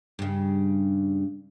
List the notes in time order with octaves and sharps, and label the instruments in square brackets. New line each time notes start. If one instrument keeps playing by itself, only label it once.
[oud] G2 C#3